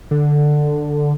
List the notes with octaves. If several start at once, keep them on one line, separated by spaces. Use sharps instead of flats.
D3